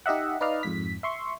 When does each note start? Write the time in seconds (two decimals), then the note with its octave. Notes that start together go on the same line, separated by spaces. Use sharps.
0.06 D#4 G4 D#5 E5 F#5
0.41 D#4 B4 D5 D#5 F5 F6
0.63 F2 G#2 B6
1.03 E5 C6 C#6